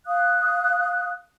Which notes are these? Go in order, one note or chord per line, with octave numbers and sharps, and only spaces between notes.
F5 D#6 F#6